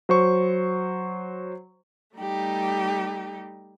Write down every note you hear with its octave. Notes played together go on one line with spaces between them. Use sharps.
F#3 C5 C#6
G3 A3 D#4 G4